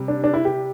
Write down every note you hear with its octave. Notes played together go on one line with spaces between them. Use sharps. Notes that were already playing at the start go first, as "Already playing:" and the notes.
Already playing: C3 G3
D4
D4
E4
G4